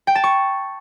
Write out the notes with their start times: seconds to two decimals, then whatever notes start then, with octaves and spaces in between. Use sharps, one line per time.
0.07 G5
0.15 A5
0.24 C#6